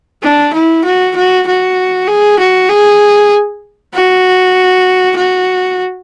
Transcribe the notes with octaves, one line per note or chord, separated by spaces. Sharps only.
D4
E4
F#4
F#4
F#4
G#4
F#4
G#4
F#4
F#4